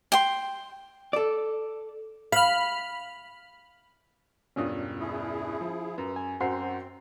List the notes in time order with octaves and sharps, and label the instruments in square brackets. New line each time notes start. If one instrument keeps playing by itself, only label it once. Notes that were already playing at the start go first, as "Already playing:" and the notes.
[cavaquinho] G5 C6
[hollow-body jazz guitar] A4 D5
[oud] F5 [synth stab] B5 F6
[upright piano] E1 G2 D#6 [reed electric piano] C#4 F4
[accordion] E4 G#4
[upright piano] F3
[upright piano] F#2 [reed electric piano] B4
[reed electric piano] G#5
[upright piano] F#2 [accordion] C4 [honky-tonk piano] F#4 C5 C7